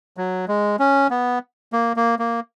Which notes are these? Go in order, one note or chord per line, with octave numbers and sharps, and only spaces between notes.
F#3
G#3
C#4
B3
A#3
A#3
A#3